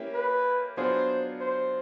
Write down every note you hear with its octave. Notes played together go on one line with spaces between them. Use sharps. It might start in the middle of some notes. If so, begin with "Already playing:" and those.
Already playing: A#3 C#4 E4 G4
B4
F#3 B3 D4 F4 G#4 C5
C5